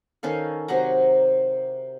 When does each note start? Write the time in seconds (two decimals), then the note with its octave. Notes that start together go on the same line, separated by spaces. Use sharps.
0.23 D#3 C#4 A4 F5
0.68 C3 F#3 F#5 A#5